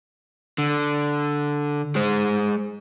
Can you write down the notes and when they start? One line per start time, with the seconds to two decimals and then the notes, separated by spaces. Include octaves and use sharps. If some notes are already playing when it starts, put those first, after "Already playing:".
0.58 D3
1.96 G#3 C5